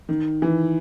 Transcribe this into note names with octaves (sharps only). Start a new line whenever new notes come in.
D#3
E3